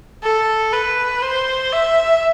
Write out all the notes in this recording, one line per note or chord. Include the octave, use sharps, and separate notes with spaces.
A4
B4
C5
E5